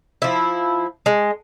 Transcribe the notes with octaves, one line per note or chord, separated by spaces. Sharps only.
F3 E4
G#3